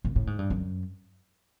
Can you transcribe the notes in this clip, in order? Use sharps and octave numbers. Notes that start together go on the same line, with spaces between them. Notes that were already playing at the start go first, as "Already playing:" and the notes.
A#2
A2
G#2
G2
F#2